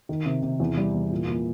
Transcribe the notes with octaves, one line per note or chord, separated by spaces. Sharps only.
D#3
C3
C3
E2
G3
E2
A#2
A#2